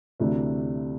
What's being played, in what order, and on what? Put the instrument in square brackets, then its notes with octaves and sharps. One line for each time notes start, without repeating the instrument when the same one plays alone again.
[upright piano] D2 C3 E3 A3 D4